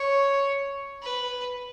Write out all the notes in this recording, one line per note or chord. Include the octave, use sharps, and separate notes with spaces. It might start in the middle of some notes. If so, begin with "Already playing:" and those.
Already playing: C#5
B4